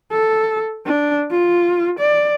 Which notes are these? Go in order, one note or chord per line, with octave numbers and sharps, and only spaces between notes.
A4
D4
F4
D5